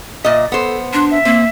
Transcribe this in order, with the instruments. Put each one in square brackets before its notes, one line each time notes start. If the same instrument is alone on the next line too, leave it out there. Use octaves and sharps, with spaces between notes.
[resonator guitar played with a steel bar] A#2 D#5 [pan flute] E5
[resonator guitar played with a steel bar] B3 C5 [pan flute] A4
[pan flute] D4 [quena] C6
[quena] E5
[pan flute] A#3 [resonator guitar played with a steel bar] C4